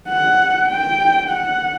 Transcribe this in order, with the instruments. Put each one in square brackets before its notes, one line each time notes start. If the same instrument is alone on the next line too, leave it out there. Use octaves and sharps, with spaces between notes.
[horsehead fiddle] F#5
G5
F#5